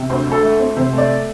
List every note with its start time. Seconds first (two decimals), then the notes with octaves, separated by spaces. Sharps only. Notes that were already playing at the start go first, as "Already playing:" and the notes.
Already playing: C3
0.10 D2 C5
0.27 D2 A4
0.43 A3
0.60 C4
0.77 C3 C5
0.93 A3 D5